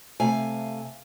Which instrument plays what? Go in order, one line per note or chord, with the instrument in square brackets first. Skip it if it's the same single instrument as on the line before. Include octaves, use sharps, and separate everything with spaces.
[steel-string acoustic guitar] C3 A3 F5 G#5